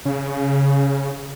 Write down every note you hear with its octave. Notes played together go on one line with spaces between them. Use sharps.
C#3